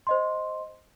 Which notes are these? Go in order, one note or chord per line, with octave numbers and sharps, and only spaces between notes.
C5 D#5 C6